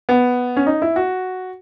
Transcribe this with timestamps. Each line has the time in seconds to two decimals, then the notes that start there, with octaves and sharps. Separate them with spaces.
0.09 B3
0.57 C#4
0.66 D#4
0.82 E4
0.96 F#4